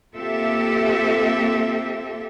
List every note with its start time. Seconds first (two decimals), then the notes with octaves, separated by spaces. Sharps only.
0.13 A#3 C4 F4 G4 A4 E5